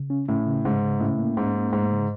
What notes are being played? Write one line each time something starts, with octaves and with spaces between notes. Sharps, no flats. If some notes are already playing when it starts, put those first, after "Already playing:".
Already playing: C#3
C#4
A2 C#4
C#3
G#2 C#3
C#3
A2 C#4
A#3
G#2 C#4
A#3
G#2 A3
C#3